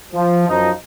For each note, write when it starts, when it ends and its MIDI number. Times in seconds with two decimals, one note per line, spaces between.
0.13 0.45 53
0.49 0.70 42
0.49 0.70 53
0.49 0.70 63